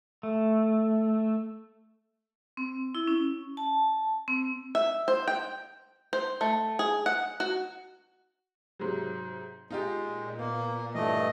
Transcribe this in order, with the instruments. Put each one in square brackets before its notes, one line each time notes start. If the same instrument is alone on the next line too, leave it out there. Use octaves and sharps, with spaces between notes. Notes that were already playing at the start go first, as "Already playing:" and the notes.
[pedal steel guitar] A3
[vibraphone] C4
E4
C#4
A5
C4
[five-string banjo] E5
C5
G5
C5
A3
G#4
F#5
F#4
[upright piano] G#2 C3 F#3
[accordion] G#3 [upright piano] D#4 F4 G4
[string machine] A#2
[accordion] A#3 [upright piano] B3
[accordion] G2 A3 D#5 [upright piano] E3